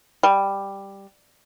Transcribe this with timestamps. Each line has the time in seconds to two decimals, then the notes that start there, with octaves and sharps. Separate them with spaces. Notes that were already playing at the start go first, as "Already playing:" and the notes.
0.23 G3